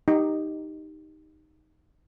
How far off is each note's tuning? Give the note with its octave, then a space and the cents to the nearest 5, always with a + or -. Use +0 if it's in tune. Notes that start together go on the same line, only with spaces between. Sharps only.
D#4 +0 G4 +0